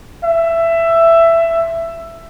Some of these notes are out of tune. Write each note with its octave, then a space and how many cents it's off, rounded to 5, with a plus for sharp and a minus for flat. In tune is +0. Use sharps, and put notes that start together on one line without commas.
E5 +15